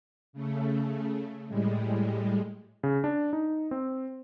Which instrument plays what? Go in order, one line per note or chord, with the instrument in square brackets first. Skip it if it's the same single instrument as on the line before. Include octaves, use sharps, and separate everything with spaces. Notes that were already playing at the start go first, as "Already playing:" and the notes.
[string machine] C#3 A3
A2 G3 G#3
[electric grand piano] C#3
D4
D#4
C4